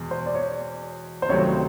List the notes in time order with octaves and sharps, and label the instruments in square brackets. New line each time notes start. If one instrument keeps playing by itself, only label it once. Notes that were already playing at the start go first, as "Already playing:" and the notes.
Already playing: [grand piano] E2 B2 G#3
[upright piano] C5
D5
C#5
C5
[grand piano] C#2 C3 D#3 F#3 A3 [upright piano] C#5